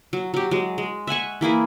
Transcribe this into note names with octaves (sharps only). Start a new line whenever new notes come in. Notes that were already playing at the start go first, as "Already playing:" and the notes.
F#3
F#3 G4
F#3 G#3
G#3
E5 F#5 G#5 C#6
E3 A#3 E4 G#4